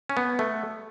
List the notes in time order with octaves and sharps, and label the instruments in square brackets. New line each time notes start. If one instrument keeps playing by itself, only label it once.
[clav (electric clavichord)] C#4
B3
A3